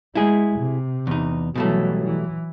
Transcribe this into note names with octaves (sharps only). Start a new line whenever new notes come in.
G#3 E4 G#4
C3
E2 D#4
B2 E3 F#3 G3 A3
E3